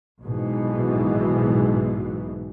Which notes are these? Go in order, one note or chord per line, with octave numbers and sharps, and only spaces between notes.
B1 G#2 B2 E3